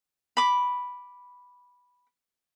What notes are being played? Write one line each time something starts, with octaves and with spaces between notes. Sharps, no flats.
B5 D6